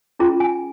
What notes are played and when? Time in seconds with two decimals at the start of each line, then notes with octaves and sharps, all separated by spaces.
0.19 C#4 F4 G#4 A#5
0.40 G#5